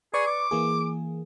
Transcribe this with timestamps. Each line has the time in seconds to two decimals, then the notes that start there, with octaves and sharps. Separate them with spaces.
0.14 G#4 B4 D5 C#6
0.27 D6
0.51 E3 A#3 G#4